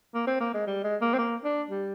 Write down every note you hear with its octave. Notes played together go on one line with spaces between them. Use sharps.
A#3
C4
A#3
G#3
G3
G#3
A#3
C4
A#3
D4
G3